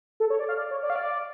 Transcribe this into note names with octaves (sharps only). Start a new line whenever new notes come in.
A4
C#5
D5
F5
D5
C#5
D5
F5
D5